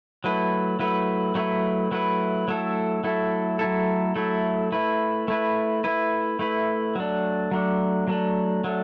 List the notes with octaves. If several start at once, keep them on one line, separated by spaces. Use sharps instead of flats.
F#3 A3 E4 B4
F#3 A3 E4 B4
F#3 A3 E4 B4
F#3 A3 E4 B4
F#3 A3 E4 A4
F#3 A3 E4 A4
F#3 A3 E4 A4
F#3 A3 E4 A4
A3 E4 B4
A3 E4 B4
A3 E4 B4
A3 E4 B4
F#3 A3 D4
F#3 A3 D4
F#3 A3 D4
F#3 A3 D4